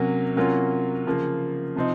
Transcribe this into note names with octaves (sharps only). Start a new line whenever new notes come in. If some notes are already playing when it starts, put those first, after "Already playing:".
Already playing: C3 F#3 A#3 C#4
C3 F#3 A#3 C#4 F4
C#3 F3 A#3
C3 F3 C4 D#4